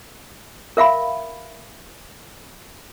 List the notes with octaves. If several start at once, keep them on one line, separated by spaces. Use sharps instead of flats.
A#4 E5 F5 B5